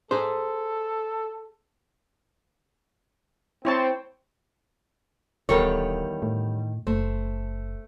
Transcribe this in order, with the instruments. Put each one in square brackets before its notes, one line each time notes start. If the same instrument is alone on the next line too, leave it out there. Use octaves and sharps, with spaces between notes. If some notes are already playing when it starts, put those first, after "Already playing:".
[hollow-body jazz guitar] G#4 C5 [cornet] A4
[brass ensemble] C4 [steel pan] E4 C#5 A5
[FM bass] D1 [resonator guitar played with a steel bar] E2 G3 C#5 [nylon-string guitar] D#3 A4 A#4
[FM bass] A2
[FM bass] F#1 [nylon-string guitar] A3 [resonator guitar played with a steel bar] C5